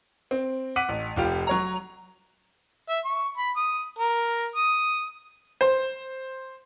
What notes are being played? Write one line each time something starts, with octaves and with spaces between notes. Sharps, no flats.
C4
F#5 D6 B6 D#7
A1
F1 F4 G4
F#3 C#5 A#5
E5
C#6
B5
D#6
A#4
D#6
C5